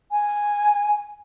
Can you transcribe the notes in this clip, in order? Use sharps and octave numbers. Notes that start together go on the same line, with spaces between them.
G#5